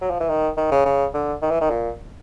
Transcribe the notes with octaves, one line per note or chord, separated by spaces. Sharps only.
F#3
F3
E3
D#3
D#3
C#3
C#3
D3
D#3
E3
D#3
A#2